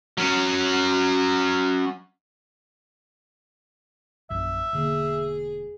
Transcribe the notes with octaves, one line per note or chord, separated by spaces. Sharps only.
F#3 C#4
A#1 F#2 E5
E1 D3 A#3 G#4